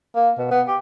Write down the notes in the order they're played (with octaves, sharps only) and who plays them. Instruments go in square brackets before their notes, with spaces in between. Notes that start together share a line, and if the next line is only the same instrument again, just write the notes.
[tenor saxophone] A#3
B2
B3
G4